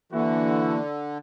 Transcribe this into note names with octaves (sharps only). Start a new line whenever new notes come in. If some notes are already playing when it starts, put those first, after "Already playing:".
D3 E3 A#3 E4 F#4